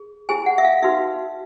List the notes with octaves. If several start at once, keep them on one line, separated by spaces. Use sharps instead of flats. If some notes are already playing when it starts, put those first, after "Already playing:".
Already playing: G#4
E4 G#4 C5 G#5
F#5
E5
F5
D#4 F#4 B4 E5